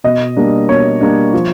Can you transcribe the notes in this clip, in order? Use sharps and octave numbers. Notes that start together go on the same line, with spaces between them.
B2 D#5
G3 A#3 D4
B2 C#5
G3 A#3 D4
F3